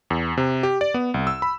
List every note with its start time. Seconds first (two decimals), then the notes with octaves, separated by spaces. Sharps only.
0.10 E2
0.37 C3
0.63 G4
0.81 D5
0.94 B3
1.14 C2
1.27 E6
1.42 B5